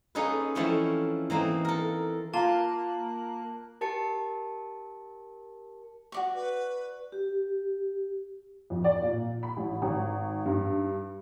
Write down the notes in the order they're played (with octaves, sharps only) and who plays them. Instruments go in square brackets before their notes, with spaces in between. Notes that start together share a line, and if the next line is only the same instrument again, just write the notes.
[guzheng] A#3 C#4 D#4 G#4 A4 B4
E3 F3 A3 C4 C#4 E4
E3 A#3 C4 D#4
A4 A#4
[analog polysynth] A#3 F#6 [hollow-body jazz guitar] F4 [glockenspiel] A5
[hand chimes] G4 A#4 A5 A6 C#7
[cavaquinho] F#4 D5 C#6
[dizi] B4
[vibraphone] G4
[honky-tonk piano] F2
D5
A#2
B5
A1
G#1
G2